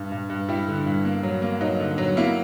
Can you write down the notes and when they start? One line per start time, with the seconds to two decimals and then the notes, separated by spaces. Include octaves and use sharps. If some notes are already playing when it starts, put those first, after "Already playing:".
Already playing: G2
0.12 G2
0.30 G2
0.49 G3 E4
0.68 D3
0.86 G2
1.05 A#3
1.23 F#3
1.42 A#3
1.61 F#3 D#4
1.80 D3
1.98 F#3
2.17 A#3 E4